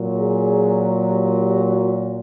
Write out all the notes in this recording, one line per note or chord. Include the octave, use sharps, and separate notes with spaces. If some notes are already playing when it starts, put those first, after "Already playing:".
Already playing: A#2 F#3
G#4
G4
G4
F#4